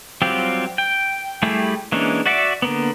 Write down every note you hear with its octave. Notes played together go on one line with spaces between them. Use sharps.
F#3 G3 C4 F4 G4
G5
G3 A3 E4 G4 G#4
E3 G#3 A#3 C#4 D4
F#4 D5 E5 F#5 D6
D3 A#3 B3